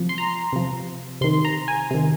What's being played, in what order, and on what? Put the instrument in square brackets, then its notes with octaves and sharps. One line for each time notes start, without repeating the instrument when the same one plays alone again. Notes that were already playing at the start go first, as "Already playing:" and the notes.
Already playing: [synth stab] C3 F3
C6
A#5
C3 F3
C3 D#3 C6
A#5
G#5
C3 D#3